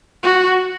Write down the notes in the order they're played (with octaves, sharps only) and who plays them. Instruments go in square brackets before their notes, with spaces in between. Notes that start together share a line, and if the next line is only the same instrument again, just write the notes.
[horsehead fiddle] F#4